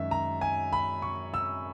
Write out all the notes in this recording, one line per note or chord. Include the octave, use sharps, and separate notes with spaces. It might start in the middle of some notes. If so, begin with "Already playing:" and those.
Already playing: F#2 D#3 G#3 E5
A#5
G#5
B5
C#6
E6